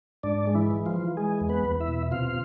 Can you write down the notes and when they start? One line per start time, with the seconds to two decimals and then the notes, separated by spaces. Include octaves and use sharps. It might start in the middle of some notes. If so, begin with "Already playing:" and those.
0.23 G#2 D4 D5
0.47 G#3
0.55 E3 E4
0.71 E3
0.86 F3 F4
0.94 E3
1.17 G#3 G#4
1.41 E2
1.49 B3 B4
1.65 E2
1.80 E4 E5
1.88 B2
2.11 C3 F4 F5